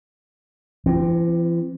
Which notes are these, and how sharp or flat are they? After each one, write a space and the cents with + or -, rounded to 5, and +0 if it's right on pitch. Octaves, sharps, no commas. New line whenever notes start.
E3 +45 C4 +0